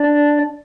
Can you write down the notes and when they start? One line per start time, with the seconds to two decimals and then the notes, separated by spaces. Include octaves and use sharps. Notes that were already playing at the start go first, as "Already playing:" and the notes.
Already playing: D4 D5